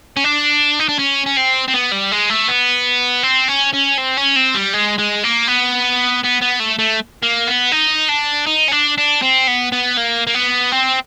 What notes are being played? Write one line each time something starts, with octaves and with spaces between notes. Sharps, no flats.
C#4
D4
D#4
D4
C#4
C#4
C4
C4
B3
G3
G#3
A3
B3
C4
C#4
C#4
C4
C#4
C4
G3
G#3
G#3
A#3
B3
B3
B3
A3
A3
A#3
B3
D#4
D4
D#4
C#4
D4
D4
C4
B3
B3
A#3
A#3
B3
C4